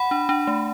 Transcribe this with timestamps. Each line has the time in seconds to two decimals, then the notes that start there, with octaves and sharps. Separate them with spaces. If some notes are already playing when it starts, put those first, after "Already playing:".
Already playing: F#5 B5
0.11 D4
0.29 D4
0.47 A3